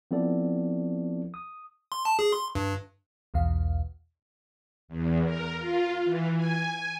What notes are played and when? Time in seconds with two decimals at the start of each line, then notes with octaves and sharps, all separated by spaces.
0.11 F3 B3 C4 E4 A4 D5
1.34 D#6
1.92 C6
2.05 A5
2.19 G#4
2.33 C6
2.55 G2
3.34 B1 E2 B2 F5
4.88 E2
5.23 A#4
5.59 F4
6.04 E3
6.36 G#5